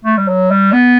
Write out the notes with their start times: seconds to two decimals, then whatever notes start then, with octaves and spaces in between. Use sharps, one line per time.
0.05 A3
0.17 G3
0.28 F#3
0.51 G3
0.73 B3